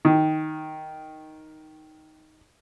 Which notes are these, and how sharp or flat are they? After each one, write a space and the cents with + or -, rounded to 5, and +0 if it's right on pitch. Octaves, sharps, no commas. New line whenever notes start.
D#3 +5